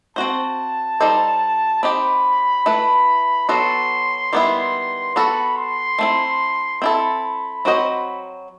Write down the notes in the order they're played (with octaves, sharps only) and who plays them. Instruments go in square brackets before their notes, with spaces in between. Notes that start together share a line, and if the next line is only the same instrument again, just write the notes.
[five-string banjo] C4 F#4 C5 [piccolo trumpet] A5
[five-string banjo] G3 D#4 A4 C5
[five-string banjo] C4 D#4 G4 [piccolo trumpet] B5
[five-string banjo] A3 E4 B4
[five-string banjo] F#3 B3 F#4 A4 [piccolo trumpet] C6
[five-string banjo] D#3 G3 B3 E4
[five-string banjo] B3 F#4 A4 [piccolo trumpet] B5
[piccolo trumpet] C6
[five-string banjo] A3 C4 E4
[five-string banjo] C4 E4 A4 [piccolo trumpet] B5
[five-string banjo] F#3 C4 F#4 C5 D#5